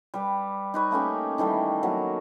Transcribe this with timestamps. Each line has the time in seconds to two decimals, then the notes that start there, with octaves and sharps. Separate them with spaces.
0.14 G3 B4
0.74 D#4 B4 C#5
0.91 A3 A#3 C#4 G4
1.38 D#3 E3 G3 A3
1.83 F#3 A#3 B3